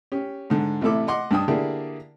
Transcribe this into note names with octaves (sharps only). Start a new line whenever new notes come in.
C#4 G4
G#2 D3
A1 C3 A3 E4 A4 D6
D#5 F#5 C6 D6
G2 D4 G5 A5 D#6
D3 A#3 E4 G4 G#4 D5